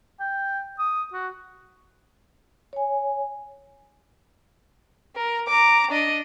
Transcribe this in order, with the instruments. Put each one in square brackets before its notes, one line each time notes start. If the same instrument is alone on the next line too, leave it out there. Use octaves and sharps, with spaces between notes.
[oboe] G5
D#6
F#4
[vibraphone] C#5 G#5
[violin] A#4
A#5 D6
D4 D#5